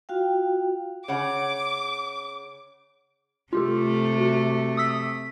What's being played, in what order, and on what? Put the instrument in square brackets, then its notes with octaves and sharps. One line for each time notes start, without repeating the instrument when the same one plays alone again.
[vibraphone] F4 F#4 F5 G5
[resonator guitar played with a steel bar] C#3 C#5 F#5 [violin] D6
[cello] C3 A3 [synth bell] F4 G4 A4
[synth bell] F#4
D#6 E6 B6